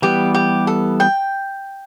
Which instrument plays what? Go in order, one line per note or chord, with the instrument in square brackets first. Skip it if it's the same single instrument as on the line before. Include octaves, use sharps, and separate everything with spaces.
[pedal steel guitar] E3 G3 B3 [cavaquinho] G4
[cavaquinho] G4
A4
G5